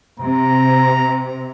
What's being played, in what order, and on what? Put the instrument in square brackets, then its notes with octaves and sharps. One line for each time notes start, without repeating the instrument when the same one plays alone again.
[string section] C3 [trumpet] A#5